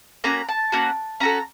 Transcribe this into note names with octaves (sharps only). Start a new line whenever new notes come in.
A#3 C#4 F#4 A#5
A5
A#3 C#4 F#4
C#4 F#4 A4 A#5